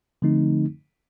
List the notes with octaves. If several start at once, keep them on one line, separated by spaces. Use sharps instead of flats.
D3 F3 A3 C4 D#4